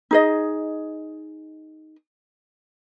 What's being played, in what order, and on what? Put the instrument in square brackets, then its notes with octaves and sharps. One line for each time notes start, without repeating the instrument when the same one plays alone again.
[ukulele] D#4 G#4 D#5